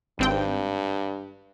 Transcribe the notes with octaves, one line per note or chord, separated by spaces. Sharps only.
G#1 G2 C4 G5